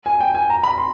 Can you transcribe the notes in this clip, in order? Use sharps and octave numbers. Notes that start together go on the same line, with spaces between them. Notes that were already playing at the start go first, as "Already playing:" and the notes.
G#5
G5
G#5
A#5
B5
C6